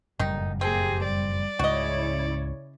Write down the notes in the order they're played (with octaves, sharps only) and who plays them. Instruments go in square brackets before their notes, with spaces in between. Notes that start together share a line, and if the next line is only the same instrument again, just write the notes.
[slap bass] F#1 F2 A2 [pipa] D#3 D#4 [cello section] G3
[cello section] A#3 G4 [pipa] C4 [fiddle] G#4
[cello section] G3 [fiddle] D5
[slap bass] C#2 G#2 [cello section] C#3 E4 C#5 [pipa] F#4 D#5